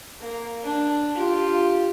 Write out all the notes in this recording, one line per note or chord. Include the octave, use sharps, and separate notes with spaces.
A#3
D4
F4 G4